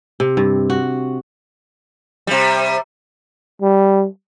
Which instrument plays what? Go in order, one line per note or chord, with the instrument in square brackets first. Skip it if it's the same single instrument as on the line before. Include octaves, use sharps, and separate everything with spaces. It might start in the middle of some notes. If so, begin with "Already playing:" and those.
[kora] C3
G2
F#4
[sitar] C3 G3
[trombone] G3